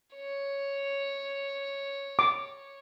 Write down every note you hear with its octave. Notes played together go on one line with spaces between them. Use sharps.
C#5
D6